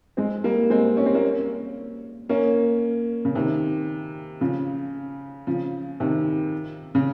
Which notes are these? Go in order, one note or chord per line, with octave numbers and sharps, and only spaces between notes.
G#3 C4
G3 A#3
G#3 C4
C#4
C4
A#3 C#4
A#3 C#4
C#3
C3 D#3
C#3 F3
C#3 F3
C3 D#3
C#3